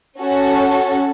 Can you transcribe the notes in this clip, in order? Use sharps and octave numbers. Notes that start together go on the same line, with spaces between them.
C#4 F#4 A4